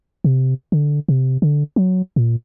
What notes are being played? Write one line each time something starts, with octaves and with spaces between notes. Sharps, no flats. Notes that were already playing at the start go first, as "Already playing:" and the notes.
C3
D3
C3
D3
F#3
A#2